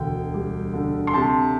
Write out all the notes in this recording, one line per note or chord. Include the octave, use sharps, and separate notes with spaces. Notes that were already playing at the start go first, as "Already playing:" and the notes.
Already playing: E1 D2 G5
G3
D3
C6
C3 A5